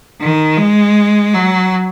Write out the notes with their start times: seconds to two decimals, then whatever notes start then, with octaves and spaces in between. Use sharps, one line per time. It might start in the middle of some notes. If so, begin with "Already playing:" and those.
0.20 D#3
0.57 G#3
1.34 F#3